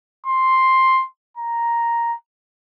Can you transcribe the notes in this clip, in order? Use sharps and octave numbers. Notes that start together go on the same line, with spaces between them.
C6
A#5